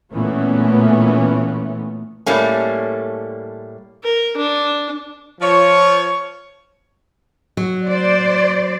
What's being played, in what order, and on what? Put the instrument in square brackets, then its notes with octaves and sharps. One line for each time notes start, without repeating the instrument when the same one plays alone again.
[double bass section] A#2 E3 A3 B3 C#4
[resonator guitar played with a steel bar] A2 G3 A3 A#3 C#4
[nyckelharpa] A#4
D4
[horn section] F3 C#5
[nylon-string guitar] F#3
[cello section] C5 D5